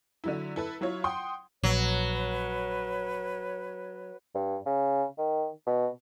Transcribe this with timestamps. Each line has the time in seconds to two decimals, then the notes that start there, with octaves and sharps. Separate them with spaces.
0.24 D3 F#3 E4
0.56 E4 A4 B4
0.81 F#3 E4 F4 C#5
1.04 F#5 G5 C6 D#6
1.64 A#1 F#3 B4 C#5
4.34 G2
4.66 C#3
5.18 D#3
5.66 B2